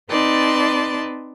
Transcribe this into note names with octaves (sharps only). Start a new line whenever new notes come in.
C4 D#4 B4 D5 A5 C6